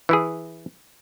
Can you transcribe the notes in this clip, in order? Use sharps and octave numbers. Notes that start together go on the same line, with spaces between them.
E3 E4 G#4